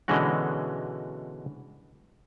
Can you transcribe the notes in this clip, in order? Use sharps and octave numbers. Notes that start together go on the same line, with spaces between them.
B2 D3 E3 G#3 C#4 F#4